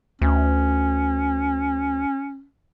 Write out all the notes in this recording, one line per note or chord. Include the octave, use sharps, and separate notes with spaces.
D2 C#4